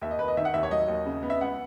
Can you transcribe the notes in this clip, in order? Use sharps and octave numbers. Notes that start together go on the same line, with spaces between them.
D#2 E5
D#5
D#2 B4
D#5
D#3 E5
F#5
D#2 E5
C#5
F#3 D#5
D#2
C#3
B3
E5
C#2 F#5